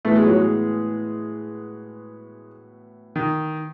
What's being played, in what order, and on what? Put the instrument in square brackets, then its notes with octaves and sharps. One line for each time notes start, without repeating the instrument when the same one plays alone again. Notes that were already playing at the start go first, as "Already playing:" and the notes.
[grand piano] A2 E3 B3 F#4 [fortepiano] A3
[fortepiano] G#3
F#3
G#3
D#3